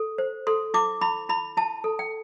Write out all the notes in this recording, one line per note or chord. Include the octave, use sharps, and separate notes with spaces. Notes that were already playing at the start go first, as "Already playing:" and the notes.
Already playing: A4
C5
A4 C6
E4 D6
E4 B5
E4 B5
E4 A5
A4
G5